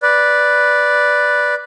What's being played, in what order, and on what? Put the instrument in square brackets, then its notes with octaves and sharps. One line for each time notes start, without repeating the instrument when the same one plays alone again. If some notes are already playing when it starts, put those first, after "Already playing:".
[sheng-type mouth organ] B4 D5